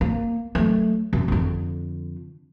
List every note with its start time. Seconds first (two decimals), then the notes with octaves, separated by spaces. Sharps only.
0.01 A#3
0.55 F#3 A3
1.13 F#2
1.28 F2 D3